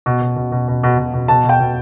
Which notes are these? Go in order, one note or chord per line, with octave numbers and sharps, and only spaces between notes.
B2
B2
B2
B2
B2
B2
B2
B2
B2 A5
B2
G5
B2